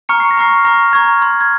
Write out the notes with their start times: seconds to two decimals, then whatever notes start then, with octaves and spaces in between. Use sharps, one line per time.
0.09 A#5 C#6 F6 C#7
0.20 C7
0.31 A#6
0.37 A#5 C#6 F6 C7
0.65 A#5 C#6 F6 A#6
0.93 A#5 C#6 F6 G#6
1.22 C6 F6
1.41 G#6